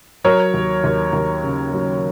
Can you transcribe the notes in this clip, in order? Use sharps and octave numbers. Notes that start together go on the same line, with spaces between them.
F#3 A#4 C#5
D#2
D#2
D#2
C#3
F#3